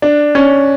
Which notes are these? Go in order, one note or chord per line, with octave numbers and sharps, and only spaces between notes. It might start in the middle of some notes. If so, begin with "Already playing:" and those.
D4
C#4